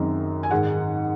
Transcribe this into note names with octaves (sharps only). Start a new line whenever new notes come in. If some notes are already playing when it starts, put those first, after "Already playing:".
Already playing: F#2 D#3 G#3 C4 D#4
G#5
G#2 D#3 G#3 F#5